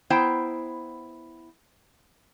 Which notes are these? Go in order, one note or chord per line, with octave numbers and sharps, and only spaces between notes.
B3 E4 C5 G5 A#5